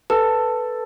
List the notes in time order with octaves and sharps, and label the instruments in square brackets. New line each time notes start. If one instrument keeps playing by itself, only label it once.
[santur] A4 [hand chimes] B4